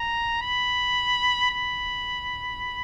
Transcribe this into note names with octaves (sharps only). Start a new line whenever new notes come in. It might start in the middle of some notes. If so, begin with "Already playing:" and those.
Already playing: A#5
B5
B5